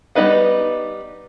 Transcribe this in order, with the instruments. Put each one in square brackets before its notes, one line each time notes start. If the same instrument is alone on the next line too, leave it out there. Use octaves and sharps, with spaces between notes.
[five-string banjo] G3 B3 D#4 B4 F#5